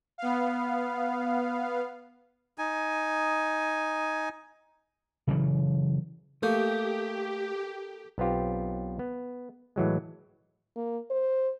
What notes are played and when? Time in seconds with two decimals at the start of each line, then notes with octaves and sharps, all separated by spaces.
0.18 B3 F5
2.58 D#4 G#5
5.28 C#3 E3 F#3
6.43 A3 A#3 G4 A4 G6
8.18 B1 B3 C4 F4 G4
8.99 B3
9.76 A2 E3 F#3 G#3
10.76 A#3
11.11 C5